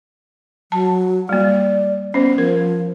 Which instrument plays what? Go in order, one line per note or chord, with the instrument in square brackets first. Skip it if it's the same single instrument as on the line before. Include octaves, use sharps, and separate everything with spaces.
[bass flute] F#3 [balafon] A5
[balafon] G3 A#3 [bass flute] D5
[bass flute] B3 [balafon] C#4 C5
[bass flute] F3 [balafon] A#4